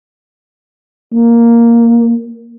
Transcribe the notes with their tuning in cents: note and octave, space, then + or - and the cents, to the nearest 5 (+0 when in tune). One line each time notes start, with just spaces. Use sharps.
A#3 +0